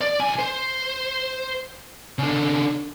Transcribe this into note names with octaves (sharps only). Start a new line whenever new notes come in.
D5
B1 G#5
C5
C#3 D4